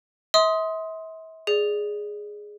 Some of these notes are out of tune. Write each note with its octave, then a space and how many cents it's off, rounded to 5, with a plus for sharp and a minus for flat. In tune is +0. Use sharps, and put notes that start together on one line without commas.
E5 -40 C6 +0 D#6 +15
G#4 +0 D5 +0